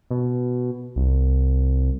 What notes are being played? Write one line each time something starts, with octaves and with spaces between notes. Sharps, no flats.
B2
C2